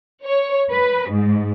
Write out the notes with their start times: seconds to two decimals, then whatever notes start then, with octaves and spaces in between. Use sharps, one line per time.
0.25 C#5
0.71 B4
1.11 G#2